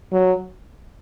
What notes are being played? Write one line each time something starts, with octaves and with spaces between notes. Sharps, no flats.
F#3